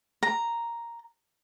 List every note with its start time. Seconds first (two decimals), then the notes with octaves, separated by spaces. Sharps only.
0.23 A#5